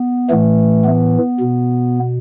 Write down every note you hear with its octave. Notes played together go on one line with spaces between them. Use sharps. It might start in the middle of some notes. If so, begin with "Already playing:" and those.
Already playing: B3
A2 E3 A3
B3
B2